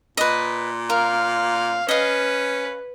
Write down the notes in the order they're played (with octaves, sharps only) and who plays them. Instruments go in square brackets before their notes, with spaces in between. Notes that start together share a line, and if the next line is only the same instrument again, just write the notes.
[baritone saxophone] A#2 [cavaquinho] B4 D#5
[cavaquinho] A#4 [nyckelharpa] F5
[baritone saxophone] C#4 [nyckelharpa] B4 [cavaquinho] D#5 F5